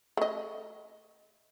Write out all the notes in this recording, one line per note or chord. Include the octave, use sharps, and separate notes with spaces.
A3 D#5